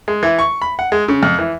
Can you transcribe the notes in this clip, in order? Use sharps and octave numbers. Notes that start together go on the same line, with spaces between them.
G#3
E3
C#6
B5
F#5
G#3
C#3
F2
E3